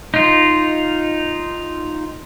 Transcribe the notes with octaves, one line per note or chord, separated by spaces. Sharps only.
D#4 F4